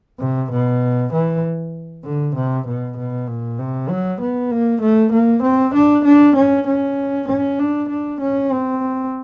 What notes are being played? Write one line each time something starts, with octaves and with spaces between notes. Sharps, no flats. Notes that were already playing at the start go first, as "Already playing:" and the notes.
C3
B2
E3
D3
C3
B2
B2
A#2
C3
F#3
B3
A#3
A3
A#3
C4
D4
D4
C#4
C#4
C#4
D4
D4
C#4
C4